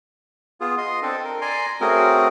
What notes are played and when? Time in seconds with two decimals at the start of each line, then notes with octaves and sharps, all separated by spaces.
0.61 B3 F4 G#4
0.78 D#5 C6
1.02 C4 D4 A4
1.24 A#4
1.41 D5 G#5 A#5 C6
1.81 A3 C4 C#4 F#4 G#4 A#4